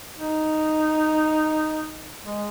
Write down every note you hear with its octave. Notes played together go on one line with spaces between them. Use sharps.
D#4
G#3